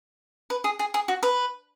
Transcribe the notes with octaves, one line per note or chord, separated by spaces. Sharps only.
B4
G#4
G#4
G#4
F#4
B4